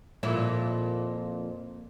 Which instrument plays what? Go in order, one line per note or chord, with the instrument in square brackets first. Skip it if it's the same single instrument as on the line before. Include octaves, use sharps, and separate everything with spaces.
[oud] F2 A#2 E4